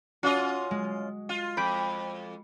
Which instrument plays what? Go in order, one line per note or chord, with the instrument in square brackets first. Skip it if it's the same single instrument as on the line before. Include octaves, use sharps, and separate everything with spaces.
[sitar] C#4 F4 D#5 [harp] F#4
[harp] G#3
[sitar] F4
[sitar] F2 [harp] B5 G6 D7